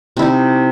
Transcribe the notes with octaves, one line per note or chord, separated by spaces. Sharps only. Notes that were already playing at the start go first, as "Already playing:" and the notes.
C3 D#4 E4